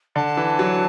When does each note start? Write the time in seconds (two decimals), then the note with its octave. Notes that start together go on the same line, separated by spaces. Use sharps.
0.16 D3 A5
0.37 E3
0.59 F#3